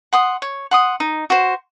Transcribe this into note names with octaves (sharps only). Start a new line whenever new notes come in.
F#5 C6 D#6
C#5
F#5 C6 D#6
D#4
F#4 C5